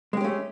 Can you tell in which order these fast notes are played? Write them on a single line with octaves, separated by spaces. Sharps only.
G#3 G4 C#4 A3